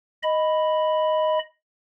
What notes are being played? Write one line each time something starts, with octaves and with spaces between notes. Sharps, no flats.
D#5 B5